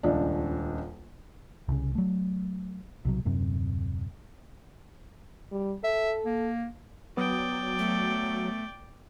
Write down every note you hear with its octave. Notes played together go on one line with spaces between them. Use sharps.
D#1 C#2 D4
C2 C#3
F#3 A3
B1 C3 F#3
D#1 F#2 C3 C4
G3
A4 E5
A#3
F#3 B3 D5 G5 D#6
A3